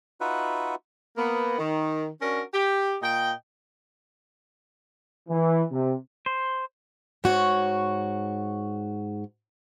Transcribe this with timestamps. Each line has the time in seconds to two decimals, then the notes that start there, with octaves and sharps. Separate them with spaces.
0.21 D#4 F4 F#4 B4 E5 F#5
1.18 A#3 B3
1.58 D#3
2.22 C#4 D4 F#4 A#4
2.54 G4
3.03 A#2 D#5 G5
5.29 E3
5.71 C3
6.26 C5
7.24 G#2 F#4 C#5